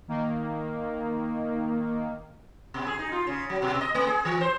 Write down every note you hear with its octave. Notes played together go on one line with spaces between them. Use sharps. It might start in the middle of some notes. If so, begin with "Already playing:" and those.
D#3 A#3
B2
G#4
D#4
F4
C#3
F#3
B2
D#5
A3
G#4
E3
C5